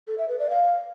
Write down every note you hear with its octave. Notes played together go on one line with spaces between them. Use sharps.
A4
E5
B4
D5
F5